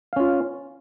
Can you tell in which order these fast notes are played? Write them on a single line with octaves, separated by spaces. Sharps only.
F5 C#4 F4